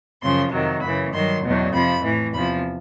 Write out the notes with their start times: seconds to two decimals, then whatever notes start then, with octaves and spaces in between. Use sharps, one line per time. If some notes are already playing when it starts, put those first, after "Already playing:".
0.23 F#2 C#3 F3 C6
0.52 F2 C3 D#3 F#3
0.82 F#2 C#3 E3 B5
1.13 G2 D#3 F#3 C6
1.42 E2 B2 F#3
1.73 F2 C3 F3 B5
2.03 A2 E3
2.33 E2 C3 F3 B5